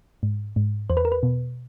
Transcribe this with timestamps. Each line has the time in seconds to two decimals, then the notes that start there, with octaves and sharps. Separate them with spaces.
0.23 G#2
0.56 G#2
0.90 E2 C5
0.97 B4
1.05 A#4
1.12 B4
1.23 B2